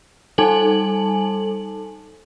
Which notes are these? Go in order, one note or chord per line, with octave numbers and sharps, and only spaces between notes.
G3 D#4 A4 G#5 A5 F#7